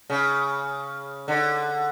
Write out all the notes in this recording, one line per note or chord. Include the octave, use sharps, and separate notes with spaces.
C#3
D3